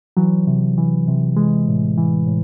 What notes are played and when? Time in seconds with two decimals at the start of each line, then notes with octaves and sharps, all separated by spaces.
0.17 E3 F#3
0.47 C3
0.78 E3
1.08 C3
1.37 E3 G#3
1.68 A2
1.98 E3
2.27 A2